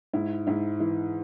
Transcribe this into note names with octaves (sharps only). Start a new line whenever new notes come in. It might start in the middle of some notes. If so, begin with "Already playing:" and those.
G#2 E4
G#2 E4
E3 E4